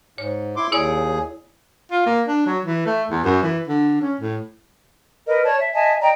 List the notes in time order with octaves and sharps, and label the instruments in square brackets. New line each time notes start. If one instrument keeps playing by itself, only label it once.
[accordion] G#2 [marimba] C#5
[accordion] E4 C6 D6
[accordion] D#2 G#4 [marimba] E4 C#5 D5
[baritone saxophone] F4
A#3
D4
F#3
E3
A3
E2
F#2
E3
D3
C#4
A2
[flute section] A#4 B4 D#5
C#5 D5 A5
E5
D#5 E5 G#5 A5
D5 D#5 G5 A#5